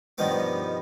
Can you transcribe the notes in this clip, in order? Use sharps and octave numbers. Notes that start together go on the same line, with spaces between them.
G2 B2 D#3 F3 B3 D6